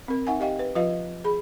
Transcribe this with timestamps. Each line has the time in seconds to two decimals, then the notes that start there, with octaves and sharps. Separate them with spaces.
0.08 C4 A#4
0.27 D#4 E5 F#5 G#5
0.40 G4 D#5 F5 G5
0.59 B4
0.75 F3 F4 B4 D#5 F5
1.24 G#4 B5